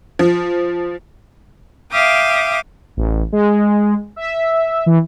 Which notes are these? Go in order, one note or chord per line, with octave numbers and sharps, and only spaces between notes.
F3
E5 F5 G5 D6 D#6
A1
G#3
E5
E3